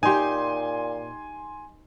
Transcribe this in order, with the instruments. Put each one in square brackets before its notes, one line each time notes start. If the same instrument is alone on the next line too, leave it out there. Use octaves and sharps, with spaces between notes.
[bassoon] A#2 [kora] D#4 G4 [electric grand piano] G#5 C6